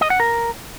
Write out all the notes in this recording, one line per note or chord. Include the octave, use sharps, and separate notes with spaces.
D#5
F#5
A#4